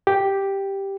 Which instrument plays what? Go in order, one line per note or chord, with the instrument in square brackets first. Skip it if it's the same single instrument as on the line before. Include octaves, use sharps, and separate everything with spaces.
[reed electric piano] G4